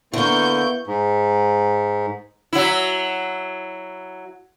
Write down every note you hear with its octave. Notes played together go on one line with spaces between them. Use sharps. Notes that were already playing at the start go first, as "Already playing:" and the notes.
D3 A#3 B3 E4 C#6 G6
G#2
F#3 E4